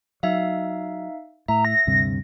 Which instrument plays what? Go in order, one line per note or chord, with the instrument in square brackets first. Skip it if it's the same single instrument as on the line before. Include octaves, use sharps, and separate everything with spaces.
[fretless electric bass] F#3 [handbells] D#4 E5 F5
[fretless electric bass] A2 [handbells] E5 [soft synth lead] A#5
[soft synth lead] A#6
[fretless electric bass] D2 G2 C3